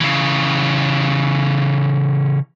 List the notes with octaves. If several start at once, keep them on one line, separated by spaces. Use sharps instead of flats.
C#3 E3